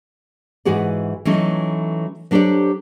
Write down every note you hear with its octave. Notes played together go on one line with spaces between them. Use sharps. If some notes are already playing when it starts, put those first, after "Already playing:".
G#2 E3 F#4 G#4 D5
E3 F#3 A3 C#4 D#4
F#3 D4 G4 A4 C5 D5